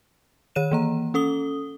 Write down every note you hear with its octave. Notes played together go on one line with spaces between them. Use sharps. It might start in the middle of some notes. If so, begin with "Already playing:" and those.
D#3 C#5 D#7 E7
E3 A#3 A#5
C#4 A4 D#6 G7